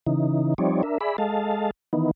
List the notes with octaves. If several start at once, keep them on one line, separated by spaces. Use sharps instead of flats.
C#3 E3 D#4
F3 G3 C4 D#4 C#5 D5
D4 A#4 E5
G#4 D5 E5 B5
G#3 A4 D#5 F5 A5
D#3 E3 B3 D#4